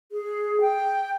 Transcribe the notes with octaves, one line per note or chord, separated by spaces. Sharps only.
G#4
G5